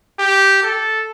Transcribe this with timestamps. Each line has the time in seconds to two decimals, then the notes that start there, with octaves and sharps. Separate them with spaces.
0.19 G4
0.63 A4